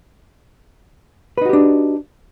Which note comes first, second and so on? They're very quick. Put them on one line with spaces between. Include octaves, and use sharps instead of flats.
B4 D#4 F#4 G4 D4